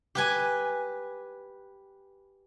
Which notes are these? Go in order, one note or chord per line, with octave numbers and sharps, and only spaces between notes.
G4 B4 G#5